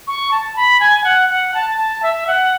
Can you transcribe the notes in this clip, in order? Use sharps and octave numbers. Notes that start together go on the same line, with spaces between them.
C#6
A5
B5
G#5
F#5
F#5
A5
A5
E5
F#5